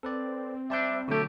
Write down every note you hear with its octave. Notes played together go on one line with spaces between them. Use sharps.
C4 A4 B4 D5
G3 D4 D5 E5 A5 G6
B2 D3 F#3 A3 G4